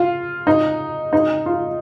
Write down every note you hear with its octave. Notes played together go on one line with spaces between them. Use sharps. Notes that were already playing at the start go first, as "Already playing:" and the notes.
Already playing: F4
D#4
D#4
F4